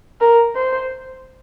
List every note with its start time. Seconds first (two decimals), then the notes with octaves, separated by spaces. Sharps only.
0.21 A#4
0.56 C5